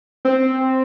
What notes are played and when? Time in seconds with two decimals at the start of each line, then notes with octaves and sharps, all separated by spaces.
0.25 C4